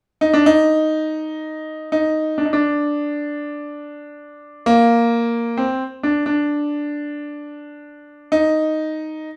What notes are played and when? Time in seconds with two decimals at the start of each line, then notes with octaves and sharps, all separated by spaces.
0.21 D#4
0.34 D4
0.46 D#4
1.92 D#4
2.38 D4
2.45 D#4
2.53 D4
4.66 A#3
5.57 C4
6.03 D4
6.26 D4
8.32 D#4